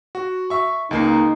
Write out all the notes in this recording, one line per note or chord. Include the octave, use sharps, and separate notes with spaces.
F#4
E5 C#6
C#2 A#3 D#4 C7